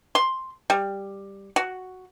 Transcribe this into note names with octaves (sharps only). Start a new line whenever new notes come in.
C6
G3
F#4